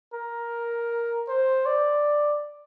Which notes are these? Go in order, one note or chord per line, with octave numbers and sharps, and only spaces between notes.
A#4
C5
D5